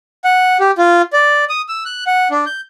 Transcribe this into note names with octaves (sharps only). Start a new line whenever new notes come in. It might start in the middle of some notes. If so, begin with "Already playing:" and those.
F#5
G4
F4
D5
D#6
E6
F#6
F#5
D4
G6